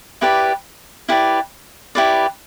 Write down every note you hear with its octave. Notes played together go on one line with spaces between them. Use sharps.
E4 G4 B4 D5
E4 G4 B4 D5
E4 G4 B4 D5